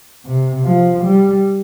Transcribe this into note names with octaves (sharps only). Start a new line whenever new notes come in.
C3
F3
G3